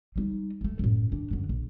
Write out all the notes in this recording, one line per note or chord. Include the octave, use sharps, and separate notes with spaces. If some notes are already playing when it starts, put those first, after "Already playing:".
G3 D#4
D#2 A3
F#2 A2
D#3 D4
F#2 D3
A#1